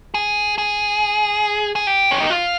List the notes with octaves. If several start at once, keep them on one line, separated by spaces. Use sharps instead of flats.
G#4
G#4
G#4
G4
C#4
D#4
F4